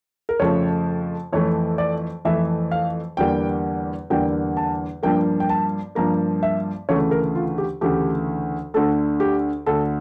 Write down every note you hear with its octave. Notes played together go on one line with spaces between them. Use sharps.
A#4
F2 C#3 F3 A3 C#5
F2 E3 A3 C#5
D5
F2 E3 A3 E5
F5
E2 D3 G3 A#3 G5
E2 D3 G3 A#3 G5
A5
G2 F3 A#3 G5
G5
A5
G2 F3 A#3 A#5
E5
D2 C#3 E3 A3 C#5
A#4
F4
G4
D2 C#3 E3 A3 G4
D2 D3 A3 A4
G4
D2 D3 A3 A4